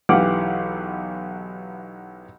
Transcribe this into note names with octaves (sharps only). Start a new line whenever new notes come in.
B1 E3 G4 F5 F#5 D6